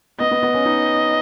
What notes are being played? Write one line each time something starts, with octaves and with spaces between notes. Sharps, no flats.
B3 D#5
B3
B3
C#4
D#4